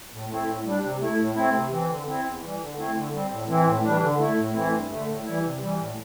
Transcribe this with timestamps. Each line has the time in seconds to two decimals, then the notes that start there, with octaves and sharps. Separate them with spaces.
0.11 A2
0.29 A3 C4 E4
0.47 A2
0.64 G3 D4
0.82 C3
1.00 A3 E4
1.18 A2
1.35 A3 C4 E4
1.53 C3
1.71 E3 C4
1.89 D3
2.06 C4 E4
2.24 E2
2.41 E3 G3
2.59 D3
2.77 A3 C4 E4
2.94 D3
3.12 G3 C4
3.30 A2
3.48 E3 C4 E4
3.66 A2
3.83 E3 G3 D4
4.01 D3
4.18 A3 E4
4.36 A2
4.54 E3 A3 C4 E4
4.72 G2
4.90 D3 A3
5.07 A2
5.25 E3 G3 E4
5.43 C3
5.60 E3 G3
5.78 A2